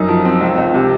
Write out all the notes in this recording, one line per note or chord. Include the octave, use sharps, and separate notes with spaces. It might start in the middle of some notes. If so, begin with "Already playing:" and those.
Already playing: F#2 D#4
F3
C4
C#2
C#2
C3